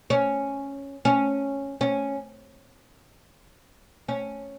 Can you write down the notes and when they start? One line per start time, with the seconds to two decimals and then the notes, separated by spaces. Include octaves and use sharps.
0.10 C#4
1.05 C#4
1.81 C#4
4.08 C#4